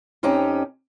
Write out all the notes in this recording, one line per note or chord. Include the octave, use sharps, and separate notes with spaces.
F2 C4 C#4 D#4 G4